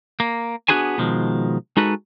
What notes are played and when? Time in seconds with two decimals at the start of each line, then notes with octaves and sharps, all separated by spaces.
0.20 A#3
0.68 B3 D4 F#4 G#4 C5 G#5
0.98 B2 D#3 F3 G#3
1.77 G#3 D#4 F#4 A4 B4